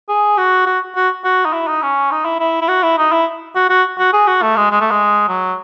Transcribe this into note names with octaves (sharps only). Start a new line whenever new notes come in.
G#4
F#4
F#4
F#4
F#4
D#4
E4
D#4
C#4
D#4
E4
E4
E4
F#4
E4
D#4
E4
F#4
F#4
F#4
G#4
F#4
A3
G#3
G#3
A3
G#3
F#3